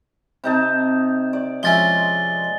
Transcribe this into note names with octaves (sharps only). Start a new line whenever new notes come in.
C3 D#4 A5
D5
F3 G#3 C#4 E4 G#5 A6 G7